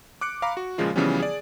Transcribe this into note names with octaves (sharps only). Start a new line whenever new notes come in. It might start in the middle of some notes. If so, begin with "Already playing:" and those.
D6 F#6 C#7 D7
F5 A#5 B5 D6
F#4
A#2 C#3 F3 G#3 F4
C#3 E3 F3 G3 B3 C#4
G#4 D5